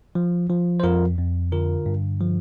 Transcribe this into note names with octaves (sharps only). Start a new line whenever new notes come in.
F3
F3
C5
F2 F4 A#4
F2
D3 F4 A#4
G2
F3